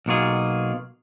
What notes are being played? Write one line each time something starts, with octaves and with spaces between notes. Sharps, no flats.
B1 B2 A#3 F4 G#4